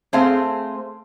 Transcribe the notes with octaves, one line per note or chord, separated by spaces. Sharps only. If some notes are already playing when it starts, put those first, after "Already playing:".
A3 C4 G#4 C5 F5